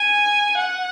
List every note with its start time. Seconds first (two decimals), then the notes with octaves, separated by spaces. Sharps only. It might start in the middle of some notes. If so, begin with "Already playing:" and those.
Already playing: G#5
0.57 F#5